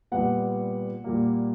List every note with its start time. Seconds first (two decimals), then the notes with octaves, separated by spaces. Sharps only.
0.12 A#2 G3 B3 F#5
1.04 A#2 G3 A#3